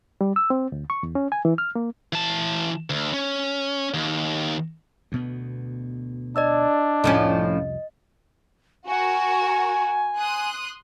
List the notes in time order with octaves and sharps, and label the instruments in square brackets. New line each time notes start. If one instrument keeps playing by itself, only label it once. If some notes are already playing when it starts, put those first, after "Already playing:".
[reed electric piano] G3
E6
C4
D2
C#6
E2
C#4
G#5
E3
F6
A#3
[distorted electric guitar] E3 A5
D2
C#4
D#2
[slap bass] D2 B2 B3
[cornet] D4 [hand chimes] D5 D#5 E6
[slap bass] C2 F2 C3 [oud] A2 F3 C#4 [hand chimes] D#5
[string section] F#4 A#4 [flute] G#5
[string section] C6 D#6 F#6